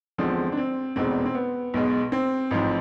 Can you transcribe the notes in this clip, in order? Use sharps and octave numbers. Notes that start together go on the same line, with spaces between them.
E2 D3 F3 G#3 C4
D4
C4
F1 E2 B2 G#3 C4
C4
B3
B1 B2 G#3
C4
A1 G#2 F3